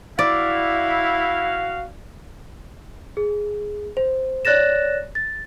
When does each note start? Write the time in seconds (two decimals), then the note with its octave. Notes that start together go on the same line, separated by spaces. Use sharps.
0.19 E4 F#4 D5 F5
3.17 G#4
3.97 C5
4.45 C#5 D5 F#6 A6 A#6 E7
5.15 A6